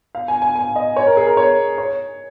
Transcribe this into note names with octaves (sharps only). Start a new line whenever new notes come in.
F5
G#5
G#5
G#5
D#5
C#5
A#4
G#4
A#4
C#5
C#5